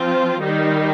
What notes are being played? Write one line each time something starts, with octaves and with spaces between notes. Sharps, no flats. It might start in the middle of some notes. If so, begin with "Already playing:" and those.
Already playing: F3 C4 F4
D#3 G3 D#4